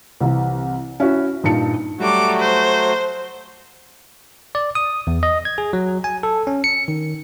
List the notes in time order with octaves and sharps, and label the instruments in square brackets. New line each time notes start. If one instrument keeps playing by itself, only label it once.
[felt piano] C2 C3 E3
C#4 E4 F#4
G2 A#2 D#4 A5 C#7
[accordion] F#3 A3 F#4 [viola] G3 D6
[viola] C5
[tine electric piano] D5
D#6
E2
D#5
G#6
G#4
F#3
G#5
A4
C#4
C#7
D#3